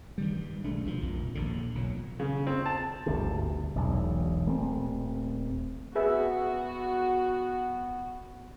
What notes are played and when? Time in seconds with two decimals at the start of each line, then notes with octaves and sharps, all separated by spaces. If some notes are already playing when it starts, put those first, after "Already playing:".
0.18 G2 D#3 G3
0.64 B1 G#3 A3 D4
0.84 C2 B2 D#3 F3
1.01 A#1 F2
1.35 A#1 D#2 D3
1.75 B1 A#2 F#3
2.20 C#3
2.47 C4
2.66 A5
3.06 G1 D2 G#2 C3
3.75 E1 B1 E2
4.46 D#1 A3 C4
5.95 B3 F#4 G#4 B4 E5